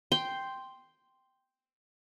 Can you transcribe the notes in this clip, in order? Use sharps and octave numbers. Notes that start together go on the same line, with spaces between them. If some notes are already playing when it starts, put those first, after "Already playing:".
G5 C6